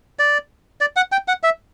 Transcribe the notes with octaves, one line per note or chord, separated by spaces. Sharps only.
D5
D5
F#5
G5
F#5
E5